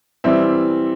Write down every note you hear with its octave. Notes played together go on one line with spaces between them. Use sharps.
E3 G3 C4 E5